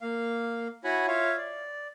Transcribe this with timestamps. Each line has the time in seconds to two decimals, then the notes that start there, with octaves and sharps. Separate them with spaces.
0.01 A#3 F5
0.84 E4 F#4 C#5 F#5 G#5 B5
1.08 F4 C#5 E5 F5
1.37 D5